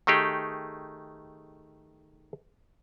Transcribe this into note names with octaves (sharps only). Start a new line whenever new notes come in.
D#3 A3 D#4 G4 G#4